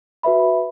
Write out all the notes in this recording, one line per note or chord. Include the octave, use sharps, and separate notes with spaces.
F#4 B4 E5 B5